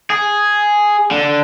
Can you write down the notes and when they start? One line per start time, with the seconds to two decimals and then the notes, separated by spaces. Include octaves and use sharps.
0.10 G#4
1.11 D3